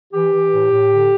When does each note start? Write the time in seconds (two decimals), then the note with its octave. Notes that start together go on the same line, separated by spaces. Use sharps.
0.13 E3 G4
0.32 E3
0.52 A2
0.71 A2
0.89 D3